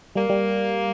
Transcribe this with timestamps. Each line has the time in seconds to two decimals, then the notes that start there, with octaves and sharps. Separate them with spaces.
0.15 G3 A#3
0.29 G3